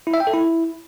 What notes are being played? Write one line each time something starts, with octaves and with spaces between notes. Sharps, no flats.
E4
E5
G5
A4
E4